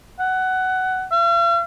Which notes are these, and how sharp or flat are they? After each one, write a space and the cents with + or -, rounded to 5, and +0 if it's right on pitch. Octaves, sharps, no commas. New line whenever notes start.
F#5 +15
F5 -45